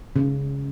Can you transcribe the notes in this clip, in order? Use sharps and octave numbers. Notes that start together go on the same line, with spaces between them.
C#3